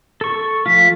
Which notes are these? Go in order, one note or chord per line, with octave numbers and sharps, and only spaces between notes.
A4 C#6
F3 A3 F4 B6